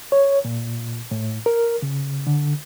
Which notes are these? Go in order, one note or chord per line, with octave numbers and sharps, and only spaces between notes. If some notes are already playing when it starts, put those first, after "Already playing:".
C#5
A#2
A2
A#4
C#3
D3